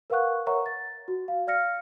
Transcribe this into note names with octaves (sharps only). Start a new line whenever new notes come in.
A#4 B4 F5 F#5 C#6 F#6
A#4 C#5 E5 F#5 A#5 C#6
A6
F#4
F5
D5 F5 F6 A#6 C#7